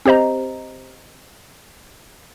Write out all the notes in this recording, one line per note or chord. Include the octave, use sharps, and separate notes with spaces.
C4 G4 C5 D#5 A#5